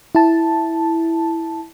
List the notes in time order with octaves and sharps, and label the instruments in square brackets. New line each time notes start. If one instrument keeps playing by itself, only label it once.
[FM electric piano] E4 A5